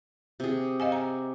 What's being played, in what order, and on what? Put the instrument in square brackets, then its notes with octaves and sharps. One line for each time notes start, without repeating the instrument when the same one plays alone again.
[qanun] C3 G#4
[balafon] D#5 F5 G#5
A#5